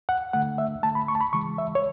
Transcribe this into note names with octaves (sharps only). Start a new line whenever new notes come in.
F#5
D3 A3 F#5
E5
D3 A3 A5
B5
C#6
A5
B5
C#3 E3 G#3 C#6
E5
C#5